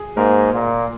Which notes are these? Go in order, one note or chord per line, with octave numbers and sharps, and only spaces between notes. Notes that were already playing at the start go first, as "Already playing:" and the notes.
Already playing: G#4
G#2 A#3 A#4
A#2